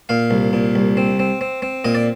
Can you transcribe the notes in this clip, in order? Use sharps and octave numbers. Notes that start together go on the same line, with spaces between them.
A#2 F5
C2
A#2
C2
C4
C4
C4
C4
A#2 D#5
D5